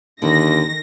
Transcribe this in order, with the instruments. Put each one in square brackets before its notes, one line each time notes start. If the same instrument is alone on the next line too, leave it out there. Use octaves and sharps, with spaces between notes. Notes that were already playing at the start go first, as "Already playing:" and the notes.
[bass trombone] D#2 [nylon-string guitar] D3 [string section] D#3 A#6